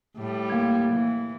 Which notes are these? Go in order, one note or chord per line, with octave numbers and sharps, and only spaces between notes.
A2 G3
A#3 G#6
E3